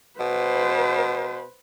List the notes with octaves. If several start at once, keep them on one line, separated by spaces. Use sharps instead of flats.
B2 B4 C5